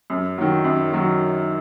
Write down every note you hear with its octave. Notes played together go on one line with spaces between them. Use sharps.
F#2
D#3 F#3
F#2
D#3 F#3